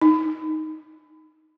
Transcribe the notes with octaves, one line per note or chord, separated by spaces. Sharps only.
D#4